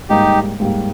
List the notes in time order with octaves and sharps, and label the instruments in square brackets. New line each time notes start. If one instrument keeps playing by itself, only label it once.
[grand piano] G#2 G3 A#3 [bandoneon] D#4 G4
[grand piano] G#2 G3 A#3